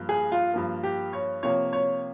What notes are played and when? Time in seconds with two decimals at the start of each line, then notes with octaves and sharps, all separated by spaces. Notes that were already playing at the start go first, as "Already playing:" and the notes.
Already playing: G2 F3 A#3
0.09 G#4
0.32 F4
0.54 G2 F3 A#3
0.83 G4
1.13 C#5
1.43 C3 F3 A#3 C#5
1.73 C#5